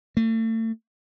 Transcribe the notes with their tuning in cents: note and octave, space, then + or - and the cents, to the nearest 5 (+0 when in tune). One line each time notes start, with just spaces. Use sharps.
A3 +35